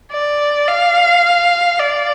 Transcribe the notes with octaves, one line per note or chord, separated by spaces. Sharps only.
D5
F5
D5